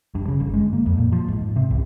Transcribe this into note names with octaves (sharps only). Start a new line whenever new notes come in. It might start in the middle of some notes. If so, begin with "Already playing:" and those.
G2
C#3
G1
G#3
A#3
F2
A#2
F3
G#2
C3
C2